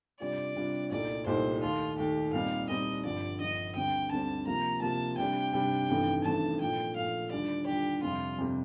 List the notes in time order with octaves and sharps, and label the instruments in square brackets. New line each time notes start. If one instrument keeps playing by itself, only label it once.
[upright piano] C3 G3 D4 F4 [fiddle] D5
[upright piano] C3 G3 D4 F4
[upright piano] C2 A#2 A3 D#4 G4 [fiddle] D5
[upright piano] C2 A#2 A3 D#4 G4 [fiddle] C5
[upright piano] D#2 D#3 A3 [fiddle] F4
[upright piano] D#2 D#3 A3 [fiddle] G4
[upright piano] A#2 G3 C4 D#4 [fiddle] F5
[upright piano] A#2 G3 C4 D#4 [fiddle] D#5
[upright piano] G1 G2 F3 [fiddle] D5
[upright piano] G1 G2 F3 [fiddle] D#5
[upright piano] D2 D3 G3 C4 [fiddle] G5
[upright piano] D2 D3 G3 C4 [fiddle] A5
[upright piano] C3 F3 A#3 [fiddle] A#5
[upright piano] C3 F3 A#3 [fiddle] A5
[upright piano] C3 G3 D4 G4 [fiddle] G5
[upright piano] C3 G3 D4 G4
A1 G2 D#3 A3 C4
[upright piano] A1 G2 D#3 A3 C4 [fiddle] A5
[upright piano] A#2 F3 A3 [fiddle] G5
[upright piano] A#2 F3 A3 [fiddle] F5
[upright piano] D#2 D3 G3 D4 F4 [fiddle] D5
[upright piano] D#2 D3 G3 D4 F4 [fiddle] G4
[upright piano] F2 C3 G3 C4 [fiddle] F4
[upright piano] F2 C3 G3 C4